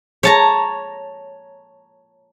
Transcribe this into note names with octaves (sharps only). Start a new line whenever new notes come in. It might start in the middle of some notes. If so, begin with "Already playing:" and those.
C#5 A5 A#5